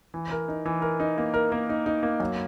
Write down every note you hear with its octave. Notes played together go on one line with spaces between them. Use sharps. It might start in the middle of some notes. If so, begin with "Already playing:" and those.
E3
A#4
D#4
E3
A#4
D#4
A#3
A#4
A#3
D#4
D#4
A#3
F#2